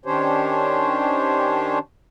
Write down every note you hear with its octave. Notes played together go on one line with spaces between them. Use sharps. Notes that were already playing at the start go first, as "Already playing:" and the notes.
D#3 C#4 D4 G4 C5 C#5